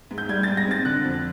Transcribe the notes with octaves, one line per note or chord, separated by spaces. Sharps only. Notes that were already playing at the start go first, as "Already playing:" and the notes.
G#2
G6
G3 G#6
A6
G#2
A#6
C4 A6
D3 F#6
F2